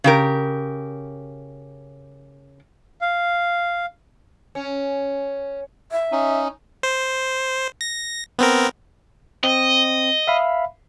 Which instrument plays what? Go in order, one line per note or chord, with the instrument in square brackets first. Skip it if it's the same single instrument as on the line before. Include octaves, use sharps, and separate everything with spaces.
[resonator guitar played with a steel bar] C#3 G4 A#4
[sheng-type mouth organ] F5
[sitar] C#4
[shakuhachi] E5
[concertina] C#4 D#4
[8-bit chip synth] C5
A#6
B3 C4 A#4
[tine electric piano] C4 [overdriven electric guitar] D#5
[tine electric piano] E5 F5 B5